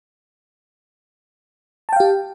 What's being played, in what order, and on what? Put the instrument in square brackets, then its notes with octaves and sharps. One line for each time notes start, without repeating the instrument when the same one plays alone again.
[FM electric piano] A5
G5
F5
G4